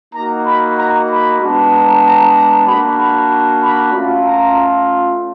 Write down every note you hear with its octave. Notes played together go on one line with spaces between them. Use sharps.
A#3 D#4 F#4 A#5
B5
A#5
B5
G#3 B3 D4
A#5
A#5
A#5
A#3 D4 F#4 B5
B5
B5
A3 C#4 F4
A#5